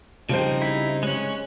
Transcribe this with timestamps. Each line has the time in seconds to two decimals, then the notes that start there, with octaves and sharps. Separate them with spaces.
0.29 C#3 F3 G3 C4 D#4 C5
0.62 E4
1.03 G#3 C#4 C#5 F#6